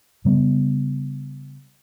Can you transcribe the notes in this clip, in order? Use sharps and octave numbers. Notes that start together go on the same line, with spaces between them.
C#3 G3 B3